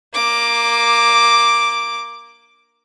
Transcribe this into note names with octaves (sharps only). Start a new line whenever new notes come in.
A#3 D6